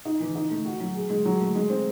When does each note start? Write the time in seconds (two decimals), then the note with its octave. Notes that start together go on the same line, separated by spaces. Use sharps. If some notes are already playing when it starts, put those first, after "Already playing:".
0.05 D#4
0.20 E3
0.35 D#4
0.50 A3
0.65 F#4
0.80 F#3
0.95 G#4
1.10 G#3
1.25 F#3
1.40 A3
1.55 G#3
1.70 C4